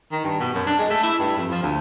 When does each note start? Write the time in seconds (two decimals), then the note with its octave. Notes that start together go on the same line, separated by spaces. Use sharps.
0.12 D#3
0.24 G2
0.40 B2
0.55 F#2
0.67 D4
0.78 G#3
0.90 A3
1.03 E4
1.19 G2
1.37 F2
1.51 F3
1.63 D2